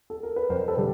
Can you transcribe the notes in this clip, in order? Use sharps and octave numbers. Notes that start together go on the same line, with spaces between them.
A4
A#4
B4
F2 A#4 C5
A4 B4
D3 G3